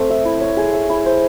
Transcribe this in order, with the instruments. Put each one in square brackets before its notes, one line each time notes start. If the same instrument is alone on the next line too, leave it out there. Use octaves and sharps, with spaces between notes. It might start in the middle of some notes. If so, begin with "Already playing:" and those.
Already playing: [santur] A3 C4
E5
E4
C#5
G#4
E5
E4
C5